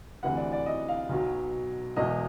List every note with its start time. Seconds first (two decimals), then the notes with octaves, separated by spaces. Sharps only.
0.23 D2 C3 E3 F#5
0.37 D5
0.52 D5
0.66 D#5
0.88 F5
1.09 B1 B2 F#3
1.96 E1 E2 B2 F#3 D#5